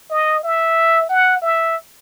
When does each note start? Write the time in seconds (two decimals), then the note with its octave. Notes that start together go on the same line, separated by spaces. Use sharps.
0.11 D#5
0.43 E5
1.09 F#5
1.42 E5